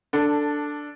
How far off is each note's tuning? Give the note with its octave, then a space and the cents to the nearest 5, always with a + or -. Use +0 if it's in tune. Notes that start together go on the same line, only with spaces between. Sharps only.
D4 +0 A4 +15